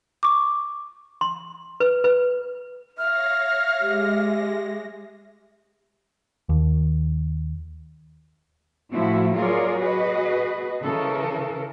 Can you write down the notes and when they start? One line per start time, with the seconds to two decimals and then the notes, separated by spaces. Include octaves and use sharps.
0.23 C#6 D6
1.21 C6
1.80 B4
2.04 B4
2.98 C#5 E5 F5 F6 A#6
3.80 G#3 G4 A#6
6.49 D#2
8.93 A2 F3 A3 E4 F#4
9.36 F#3 F4 G#4 A#4 C#5 D5
9.79 F#4 G#4 B4 D#5
10.82 C#3 E3 A4 A#4